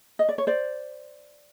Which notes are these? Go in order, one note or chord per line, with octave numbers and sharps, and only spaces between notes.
D#5
D5
C#5
C5 D5